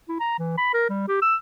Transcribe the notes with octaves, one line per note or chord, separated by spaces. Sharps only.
E4
A#5
E3
B5
A#4
G3
G4
E6